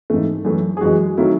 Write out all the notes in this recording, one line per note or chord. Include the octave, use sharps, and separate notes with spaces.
G#2 E3 A3
F#2 E3 A3
G#4
F#2 E3 G#3 F#4
D#3 F#3 A3 E4